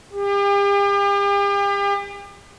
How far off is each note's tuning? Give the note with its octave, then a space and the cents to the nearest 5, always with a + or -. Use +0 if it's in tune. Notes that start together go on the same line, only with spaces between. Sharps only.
G4 +40